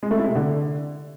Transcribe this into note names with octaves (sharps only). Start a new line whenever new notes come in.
G#3
A3
E4
C3
D3